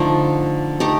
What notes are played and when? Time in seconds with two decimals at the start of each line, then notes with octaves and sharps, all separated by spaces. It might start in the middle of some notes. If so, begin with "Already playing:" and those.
Already playing: D3 F3 A3 D#4
0.80 A3 D#4 G4